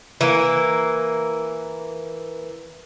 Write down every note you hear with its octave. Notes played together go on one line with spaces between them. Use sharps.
E3 A#3